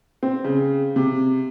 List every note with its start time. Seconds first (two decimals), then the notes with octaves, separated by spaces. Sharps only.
0.23 C4
0.44 C#3
0.96 C3